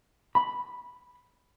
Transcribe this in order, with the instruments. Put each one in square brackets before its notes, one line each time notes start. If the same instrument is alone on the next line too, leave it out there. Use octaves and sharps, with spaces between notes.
[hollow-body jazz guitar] B5